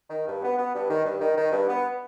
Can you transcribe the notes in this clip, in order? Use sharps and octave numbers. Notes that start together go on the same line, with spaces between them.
D#3
G2
B3
B3
G2
D#3
G2
D#3
D#3
G2
B3